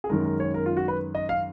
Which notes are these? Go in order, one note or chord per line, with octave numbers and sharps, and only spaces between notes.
G#4
F#2 D#3 G#3 A#4
A#4
C#5
A#4
F4
F#4
B4
D#5
F5